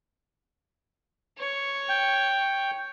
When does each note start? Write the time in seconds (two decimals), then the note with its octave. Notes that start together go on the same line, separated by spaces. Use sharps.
1.38 C#5
1.89 G5